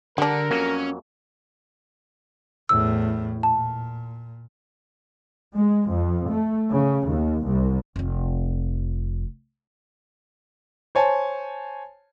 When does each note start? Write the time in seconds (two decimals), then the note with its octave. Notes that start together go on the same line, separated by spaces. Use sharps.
0.18 D3 G3 D4 A#4 F#5
0.51 F2 F#3 A#3 C#4
2.69 E2 A2 E6
3.43 A#2 A5
5.55 G#3
5.89 F2
6.29 A3
6.72 C#3
7.10 D#2
7.47 C2
7.96 F1 F2
10.95 C5 C#5 G#5 A5